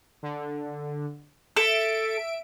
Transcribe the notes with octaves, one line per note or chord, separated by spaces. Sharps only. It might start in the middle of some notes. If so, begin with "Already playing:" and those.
D3
A4 E5 D7